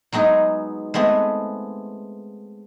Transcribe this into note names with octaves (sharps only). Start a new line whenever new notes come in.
F#3 G#3 B3 D#4 G#4
G#3 A3 B3 C4